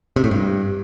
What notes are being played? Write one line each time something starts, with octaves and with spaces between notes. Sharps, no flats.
C3
A2
G2